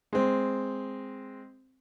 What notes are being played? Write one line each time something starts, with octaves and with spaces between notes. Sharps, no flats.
G#3 C4